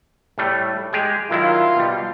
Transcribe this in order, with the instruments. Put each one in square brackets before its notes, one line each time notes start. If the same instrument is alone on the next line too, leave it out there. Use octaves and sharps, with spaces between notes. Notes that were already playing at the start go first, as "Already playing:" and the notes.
[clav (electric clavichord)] A2 G3 A3
G#3 G4 G#4
[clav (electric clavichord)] D#3 F#3 E4 [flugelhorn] F4
[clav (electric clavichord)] B2 G3